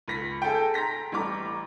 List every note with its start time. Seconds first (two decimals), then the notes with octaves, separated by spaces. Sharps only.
0.08 C#2 A#6 B6
0.42 G#4 A4 G5
0.74 A#5 C6 A#6 B6
1.12 A1 G3 A#5 D6